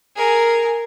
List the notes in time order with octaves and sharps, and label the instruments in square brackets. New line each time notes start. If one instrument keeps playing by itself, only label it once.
[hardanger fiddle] G#4 A#4